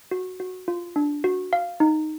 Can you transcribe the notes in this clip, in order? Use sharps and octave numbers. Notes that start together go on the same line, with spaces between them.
F#4
F#4
F4
D4
F#4
F5
D#4